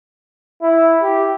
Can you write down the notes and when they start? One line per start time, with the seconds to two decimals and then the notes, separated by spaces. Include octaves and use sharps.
0.62 E4
1.02 G4